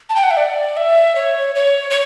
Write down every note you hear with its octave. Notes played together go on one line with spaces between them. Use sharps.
A5
G5
F#5
E5
D5
E5
C#5
C#5
C#5